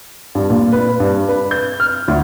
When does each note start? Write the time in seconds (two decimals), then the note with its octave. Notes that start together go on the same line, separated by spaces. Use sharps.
0.35 G2
0.50 A#2
0.72 B4
1.00 G2
1.29 B4
1.51 G6
1.80 F6
2.08 D2